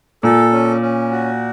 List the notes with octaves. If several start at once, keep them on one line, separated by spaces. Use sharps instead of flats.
A#2 A4
C#4
C#4
F#4